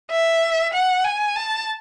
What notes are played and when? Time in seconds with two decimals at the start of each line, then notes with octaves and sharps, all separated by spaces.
0.11 E5
0.74 F#5
1.05 G#5
1.36 A5